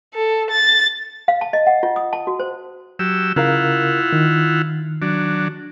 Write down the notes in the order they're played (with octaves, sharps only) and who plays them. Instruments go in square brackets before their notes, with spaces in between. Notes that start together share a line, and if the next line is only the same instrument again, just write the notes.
[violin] A4
A6
[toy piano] F5
A5
D#5
F#5
F4
D#6
A5
F#4
C5
[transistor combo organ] F#3 G4 E6
[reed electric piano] C#3 A#4 F5 [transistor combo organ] E4 F4 F#5
[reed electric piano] D#3
[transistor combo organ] F#3 D4